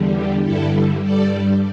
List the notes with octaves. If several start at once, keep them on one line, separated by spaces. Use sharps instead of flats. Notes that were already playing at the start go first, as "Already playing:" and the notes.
Already playing: E2 D3 G3
G4
G2 D3 G3 E4 A4
G2 G3 A4 D5